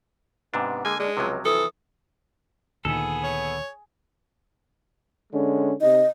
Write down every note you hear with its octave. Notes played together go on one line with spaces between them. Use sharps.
G#2 C3 B3 D4
D3 G#3 A#3 G#5
G#3 D4
C#2 C3 F3 F#3
E3 A4 D#6
D2 A#2 D#3 B3 G#4 A4
C#5
D3 G#3 C#4
C3 D#4 D#5